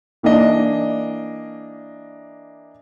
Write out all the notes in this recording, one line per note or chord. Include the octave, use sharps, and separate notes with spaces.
E3 A#3 D4 D#5